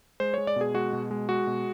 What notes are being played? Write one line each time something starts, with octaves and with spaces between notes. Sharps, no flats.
G#3 C5
G#3 C#5
D5
B2 G#4
G#3 F#4
B2
G#3
G#3 F#4
B2